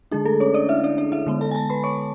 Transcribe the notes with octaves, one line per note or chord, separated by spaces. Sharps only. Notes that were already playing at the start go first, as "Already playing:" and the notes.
D3 G#3 D4 G#4
A3 A4
C#4 C#5
D4 D5
E4 E5
D4 D5
D4 D5
E4 E5
D3 G#3 B3
A4 A5
G#5
A4 A5
B4 B5
C#5 C#6